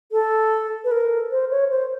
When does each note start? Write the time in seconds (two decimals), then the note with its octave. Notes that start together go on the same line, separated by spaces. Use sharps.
0.12 A4
0.84 B4
0.91 A#4
1.31 C5
1.51 C#5
1.70 C5